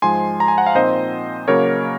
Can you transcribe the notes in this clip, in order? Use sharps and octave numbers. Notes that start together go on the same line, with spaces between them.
G#2 F3 G#3 G#5 C6
A#5
G#5
F#5
F5
A#2 F3 C4 D#4 C5 D#5
C#3 F#3 A#3 A#4 C#5